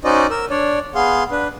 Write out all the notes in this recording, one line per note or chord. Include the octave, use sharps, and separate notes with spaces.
C#4 D#4 F#4 C5 D5 D#5
A#4 E6
D4 C#5 D5
B3 G#4 F5 C6
D4 B4